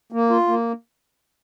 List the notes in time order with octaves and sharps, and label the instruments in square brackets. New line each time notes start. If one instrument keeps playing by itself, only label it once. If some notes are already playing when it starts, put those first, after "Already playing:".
[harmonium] A#3
F4
A#3